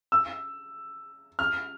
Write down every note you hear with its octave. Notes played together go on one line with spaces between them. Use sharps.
E6
F6